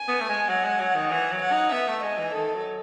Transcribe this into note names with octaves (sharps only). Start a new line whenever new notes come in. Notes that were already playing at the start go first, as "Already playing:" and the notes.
Already playing: G#5
B3
A3
G#3
F#3 F#5
G#3
F#3
D#3
E3 F#5
F#3
F#5
D#4
B3 E5
A3
G#3 D#5
E3
D#3 A4
F#3